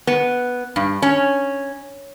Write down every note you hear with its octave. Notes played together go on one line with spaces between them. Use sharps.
B3
G2
C#4